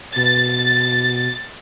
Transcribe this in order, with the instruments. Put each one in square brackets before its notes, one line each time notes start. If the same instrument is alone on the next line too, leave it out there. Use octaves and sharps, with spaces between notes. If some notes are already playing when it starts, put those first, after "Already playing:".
[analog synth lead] B2 [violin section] A6